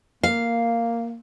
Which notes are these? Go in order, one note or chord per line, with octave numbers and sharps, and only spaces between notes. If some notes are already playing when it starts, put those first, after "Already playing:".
A#3 F5